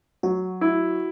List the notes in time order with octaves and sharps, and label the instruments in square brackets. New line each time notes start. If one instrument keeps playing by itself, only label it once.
[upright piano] F#3 [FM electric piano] F#4
[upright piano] E4